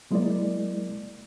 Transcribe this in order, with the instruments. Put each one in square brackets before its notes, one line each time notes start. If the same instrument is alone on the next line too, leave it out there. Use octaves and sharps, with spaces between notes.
[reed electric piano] F#3 G#3 A#3 E4 A#4 D5